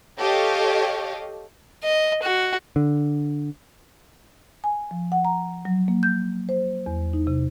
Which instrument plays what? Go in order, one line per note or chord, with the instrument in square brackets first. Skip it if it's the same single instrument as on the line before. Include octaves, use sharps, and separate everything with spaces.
[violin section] G4 A4 C#5 D#5 F5
[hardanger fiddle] D#5
F#4
[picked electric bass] D3
[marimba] G#5
F3
F#5
A#5
F#3
A#3
G6
C5
E2
D#4
C3